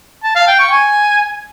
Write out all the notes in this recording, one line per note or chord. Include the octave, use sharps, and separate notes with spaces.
A5
F5
G5
C#6
G#5